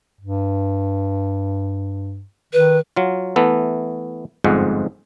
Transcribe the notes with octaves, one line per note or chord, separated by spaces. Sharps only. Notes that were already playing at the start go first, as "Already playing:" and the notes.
G2
D#3 B4
F#3 F4
E3 A3 B3 A4
G1 F2 G#2 G#3 F#5